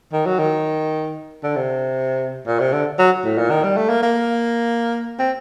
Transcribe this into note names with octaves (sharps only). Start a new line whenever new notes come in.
D#3
F#3
D#3
D3
C3
A#2
C3
D3
F#3
A2
A#2
D#3
G3
A3
A#3
A#3
C4